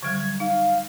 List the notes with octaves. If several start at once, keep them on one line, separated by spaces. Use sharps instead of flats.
D3 F#3 G3 G#6
D#4 F5